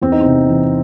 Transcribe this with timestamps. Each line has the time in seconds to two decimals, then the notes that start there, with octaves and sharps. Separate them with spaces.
0.02 E2 C4
0.12 D#4
0.21 C3 C4
0.50 E3